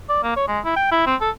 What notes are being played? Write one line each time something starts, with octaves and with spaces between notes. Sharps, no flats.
D5
A#3
C#5
G#3
E4
G5
E4
C4
A4